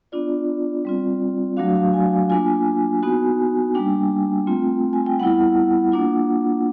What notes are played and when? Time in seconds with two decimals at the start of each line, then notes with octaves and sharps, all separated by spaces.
0.12 B3 D4 F4 D5
0.85 G3 C4 F4
1.57 F#3 A3 D4 F#4 F5
1.76 F5
1.94 G#5
2.30 A#3 D4 F4 G#5
3.03 B3 D#4 F#4
3.74 G3 A#3 D4 G5
4.47 A3 C4 F4
4.93 G#5
5.06 G5
5.19 G3 B3 E4 F#5
5.92 A#3 D4 F4